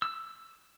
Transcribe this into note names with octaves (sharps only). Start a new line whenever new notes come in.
E6